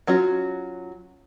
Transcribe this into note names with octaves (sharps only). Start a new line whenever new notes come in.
F#3 C#4 F4 F#4